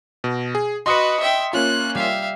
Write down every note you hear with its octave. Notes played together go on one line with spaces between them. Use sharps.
B2
G#4
F#4 B4 D#5 C6 D#6 C#7
E5 G5
A#3 C#4 F4 F#6
G3 E5 F5